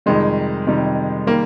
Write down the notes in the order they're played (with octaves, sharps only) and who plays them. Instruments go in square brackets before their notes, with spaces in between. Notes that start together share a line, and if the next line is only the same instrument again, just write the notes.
[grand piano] F2 C3 D#3 G3 G#3
F2 C3 D#3 G3
D#3 G3 A#3